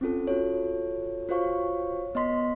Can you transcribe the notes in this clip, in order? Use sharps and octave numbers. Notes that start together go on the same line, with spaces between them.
C4 C#4 F4 A4
F4 F#4 A4 C#5
F4 F#4 C5 C#5 F5 C#6
B3 D#5 C6 B6